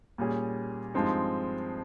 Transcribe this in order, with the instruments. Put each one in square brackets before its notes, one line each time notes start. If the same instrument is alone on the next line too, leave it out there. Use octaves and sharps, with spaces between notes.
[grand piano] A#2 G3 C#4 G#4
G2 F3 G#3 C4 D#4